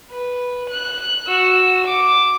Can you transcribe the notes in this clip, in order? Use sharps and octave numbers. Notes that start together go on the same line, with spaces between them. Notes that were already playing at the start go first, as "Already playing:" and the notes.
B4
F#6
F#4 E6
D6